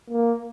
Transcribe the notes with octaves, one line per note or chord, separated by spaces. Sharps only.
A#3